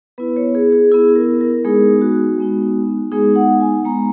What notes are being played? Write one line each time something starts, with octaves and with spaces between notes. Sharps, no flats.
B3 E4 B4
C#5
G#4
G#4
B3 E4 G#4
A#4
A#4
G#3 B3 D#4 G#4
F#4
G#3 B3 D#4
G#3 B3 D#4 G#4
F#5
G#5
G#3 B3 D#4 A#5